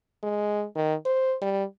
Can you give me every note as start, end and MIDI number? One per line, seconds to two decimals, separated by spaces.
0.23 0.65 56
0.76 0.95 51
1.05 1.35 72
1.41 1.64 55